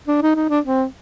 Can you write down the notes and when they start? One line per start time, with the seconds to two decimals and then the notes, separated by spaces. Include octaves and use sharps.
0.07 D4
0.22 D#4
0.35 D#4
0.49 D4
0.65 C4